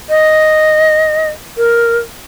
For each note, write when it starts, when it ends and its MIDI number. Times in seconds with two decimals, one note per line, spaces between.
0.10 1.28 75
1.57 1.98 70